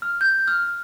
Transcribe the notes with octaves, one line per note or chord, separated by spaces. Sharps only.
F6
G6
F6